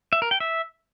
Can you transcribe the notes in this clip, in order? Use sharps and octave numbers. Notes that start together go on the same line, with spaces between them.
E5
A#4
G5
E5